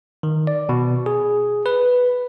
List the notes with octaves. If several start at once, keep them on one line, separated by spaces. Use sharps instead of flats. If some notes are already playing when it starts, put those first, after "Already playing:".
D#3
D5
B2
G#4
B4